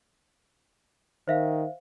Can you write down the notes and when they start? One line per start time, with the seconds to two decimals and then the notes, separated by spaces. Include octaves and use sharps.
1.28 D#3 C5 E5 F5